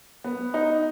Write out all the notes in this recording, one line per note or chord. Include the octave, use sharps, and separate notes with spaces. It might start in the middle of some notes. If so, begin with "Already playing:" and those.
B3
D#4